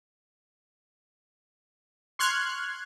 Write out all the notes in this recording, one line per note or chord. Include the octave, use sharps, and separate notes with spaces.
C6 C#6 F6 F#6 G#6